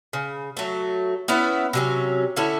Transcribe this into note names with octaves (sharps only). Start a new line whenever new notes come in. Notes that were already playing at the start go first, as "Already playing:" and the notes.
C#3
F#3 A3
B3 C#4 E4 B4
C3 F#3 C#4
D3 C#4 E4 A4